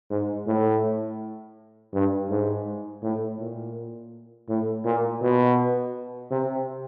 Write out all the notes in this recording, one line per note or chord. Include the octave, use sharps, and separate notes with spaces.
G#2
A2
G2
G#2
A2
A#2
A2
A#2
B2
C3